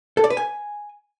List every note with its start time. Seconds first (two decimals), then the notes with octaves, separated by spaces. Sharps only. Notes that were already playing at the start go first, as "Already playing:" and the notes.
0.17 A4
0.24 D5
0.30 B4
0.37 G#5